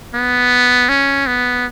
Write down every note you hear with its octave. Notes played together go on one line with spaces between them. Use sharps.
B3
C#4
B3